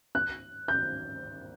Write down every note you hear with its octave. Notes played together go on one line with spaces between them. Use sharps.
F#6
G6